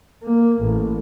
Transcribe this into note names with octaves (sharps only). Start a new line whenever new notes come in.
A#3
A1